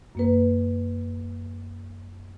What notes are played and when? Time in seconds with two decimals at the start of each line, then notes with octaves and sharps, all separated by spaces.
0.15 F#2 A#3 B4